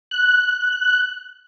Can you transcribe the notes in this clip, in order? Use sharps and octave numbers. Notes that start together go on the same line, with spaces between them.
F#6